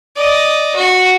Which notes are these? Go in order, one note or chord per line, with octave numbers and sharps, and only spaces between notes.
D5 D#5
F#4